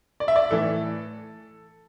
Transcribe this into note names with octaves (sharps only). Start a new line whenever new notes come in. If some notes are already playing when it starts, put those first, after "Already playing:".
D5
E5
D5
A2 E3 A4